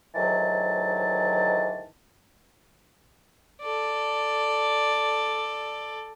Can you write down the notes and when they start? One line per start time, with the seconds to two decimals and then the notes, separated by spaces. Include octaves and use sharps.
0.15 D2 G#2 D#3 E3 F#3 A5
3.62 A4 D5